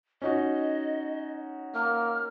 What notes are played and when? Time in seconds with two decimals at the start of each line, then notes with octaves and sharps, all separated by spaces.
0.22 C#4 D#4 F#4 D#5
1.74 A#3 F6